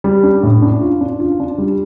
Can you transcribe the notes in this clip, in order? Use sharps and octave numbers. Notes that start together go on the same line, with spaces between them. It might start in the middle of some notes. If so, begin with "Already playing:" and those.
G3
D4
A2
D4
F4
D4
F4
D4
G3